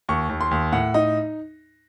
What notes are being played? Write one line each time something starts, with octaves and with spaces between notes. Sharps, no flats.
D#2 C#6
D#2
C6
D#2
A2 F#5
D#4 D#5